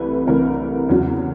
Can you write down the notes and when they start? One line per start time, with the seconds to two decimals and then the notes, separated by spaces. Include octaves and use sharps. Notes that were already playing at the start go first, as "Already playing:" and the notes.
Already playing: C2 C3 E3 A3 B4
0.27 C2 C3 E3 A3 A#4
0.89 E2 C#3 F#3